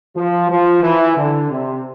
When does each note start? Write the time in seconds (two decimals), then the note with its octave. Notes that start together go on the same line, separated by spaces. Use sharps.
0.16 F3
0.49 F3
0.83 E3
1.17 D3
1.50 C3